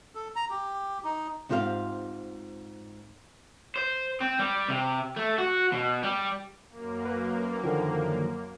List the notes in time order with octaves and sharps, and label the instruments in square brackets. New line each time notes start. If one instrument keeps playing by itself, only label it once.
[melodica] A4
A#5
G4
D#4
[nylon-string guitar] G#2 C4 F4 G4 A4 F5
[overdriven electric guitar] C5
C4
G3
C3
A3
F#4
B2
G3
[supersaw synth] F#2 A#3
[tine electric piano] B4
D3 D#3 F3